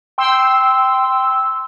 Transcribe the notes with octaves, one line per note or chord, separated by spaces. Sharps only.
G5 C6 E6